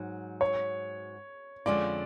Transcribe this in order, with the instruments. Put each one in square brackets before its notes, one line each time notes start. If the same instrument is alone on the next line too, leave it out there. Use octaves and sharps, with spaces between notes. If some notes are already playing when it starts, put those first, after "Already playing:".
Already playing: [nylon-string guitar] G#2 F#3
[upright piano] C#5
[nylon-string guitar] F2 D3 G#3 C#4 F4 [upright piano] D5